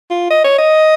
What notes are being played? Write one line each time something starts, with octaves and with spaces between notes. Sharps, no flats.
F4
D#5
C#5
D#5